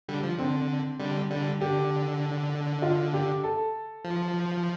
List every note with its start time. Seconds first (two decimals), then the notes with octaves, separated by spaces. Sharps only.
0.09 D3 G3
0.23 F3
0.38 D3 C4
0.99 D3 G3
1.30 D3 G3
1.61 D3 G4
2.82 F4
3.13 G4
3.44 A4
4.05 F3